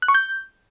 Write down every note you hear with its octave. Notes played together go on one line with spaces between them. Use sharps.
F#6
C#6
G6